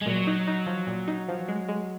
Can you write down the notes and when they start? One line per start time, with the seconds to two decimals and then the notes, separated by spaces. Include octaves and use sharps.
0.01 G#3
0.06 A#2 F#3
0.27 D#4
0.47 D#4
0.67 F3
0.87 A#2
1.08 D#4
1.29 F3
1.48 G#3
1.69 G#3